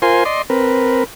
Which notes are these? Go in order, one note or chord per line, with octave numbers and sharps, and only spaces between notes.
F4 A#4 C5 G#5 C6
D5 D#5 C6
C4 A#4 B4